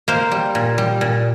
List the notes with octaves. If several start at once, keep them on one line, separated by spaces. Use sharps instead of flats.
A#3 C5
G3
A#2
G3
A#2